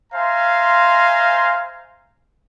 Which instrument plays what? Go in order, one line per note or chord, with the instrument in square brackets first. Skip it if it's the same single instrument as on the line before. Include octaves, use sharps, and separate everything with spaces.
[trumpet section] C5 E5 F5 G#5 A#5 C6